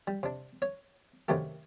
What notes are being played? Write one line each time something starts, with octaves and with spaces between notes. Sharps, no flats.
G3
C3 D4
C#5
F#2 C3 D#3 A3 G4